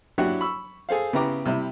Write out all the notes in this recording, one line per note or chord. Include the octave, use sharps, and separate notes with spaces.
F#3 D4 E4 F#4 G4 F#5
B5 C#6 E6
G#4 A4 C5 F5
C#3 B3 E4 G4 A#5 D6
C3 G3 E4